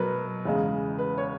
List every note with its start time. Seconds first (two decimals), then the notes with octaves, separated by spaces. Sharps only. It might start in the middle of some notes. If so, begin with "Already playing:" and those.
Already playing: B2 F#3 A#4 B4
0.45 E2 C#3 G#3
0.98 B4
1.18 C#5